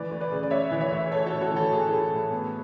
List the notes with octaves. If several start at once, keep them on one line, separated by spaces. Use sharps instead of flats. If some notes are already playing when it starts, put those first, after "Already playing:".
Already playing: D2 E3 B4 D5
D2
B4 D5
C#3
D5
D2 C#5 E5
E3
C#5 E5
D2
A3 A4 C#5
F#4 A4
A2
F#4 A4
E3 F#4 A4
A2 G#4
F#4
A3 E4 G#4
A2
B3